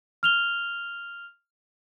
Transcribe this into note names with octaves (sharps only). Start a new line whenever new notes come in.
F6 F7 G7